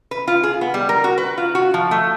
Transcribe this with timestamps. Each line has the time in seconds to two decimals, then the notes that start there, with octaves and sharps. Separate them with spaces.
0.11 B4
0.28 F4
0.43 G#4
0.61 B3
0.74 G3
0.89 A#4
1.04 F#4
1.18 B4
1.38 F4
1.55 F#4
1.74 F3
1.91 A3